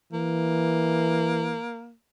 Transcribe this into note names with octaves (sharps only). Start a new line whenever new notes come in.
E3 A#3